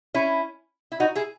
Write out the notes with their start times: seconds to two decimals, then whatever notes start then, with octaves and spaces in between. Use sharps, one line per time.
0.14 C#4 E4
0.92 E4
1.00 D#4 F#4
1.15 E4 G#4